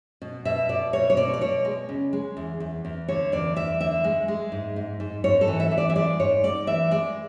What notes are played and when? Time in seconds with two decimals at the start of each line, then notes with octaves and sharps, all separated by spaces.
0.22 B2
0.45 B2 E5
0.69 B2 D5
0.93 B2 C#5
1.10 C#5
1.17 B2 D5
1.34 D5
1.41 B2 C#5
1.65 G#3
1.89 C#3
2.13 G#3
2.37 E2
2.60 E2
2.85 E2
3.08 D3 C#5
3.32 E2 D5
3.56 E2 E5
3.80 D3 E5
4.04 G#3
4.28 G#3
4.52 G#2
4.76 G#2
5.00 G#2
5.24 G#2 C#5
5.41 A4
5.48 E3
5.60 E5
5.72 E3
5.78 D5
5.90 E5
5.95 G#3 D5
6.20 G#2 C#5
6.43 G#2 D5
6.67 E3 E5
6.91 G#3 D5